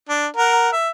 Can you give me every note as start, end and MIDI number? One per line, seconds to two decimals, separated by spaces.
0.09 0.27 62
0.37 0.70 70
0.37 0.70 78
0.72 0.89 76